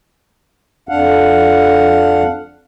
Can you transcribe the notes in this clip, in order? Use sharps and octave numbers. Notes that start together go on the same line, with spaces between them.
F2 D4 F5 F#5